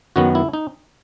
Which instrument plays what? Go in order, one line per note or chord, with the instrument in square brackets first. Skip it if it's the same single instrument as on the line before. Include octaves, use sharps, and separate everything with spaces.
[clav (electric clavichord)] F#2 D#3 F#3 B3 F#4
E4
D#4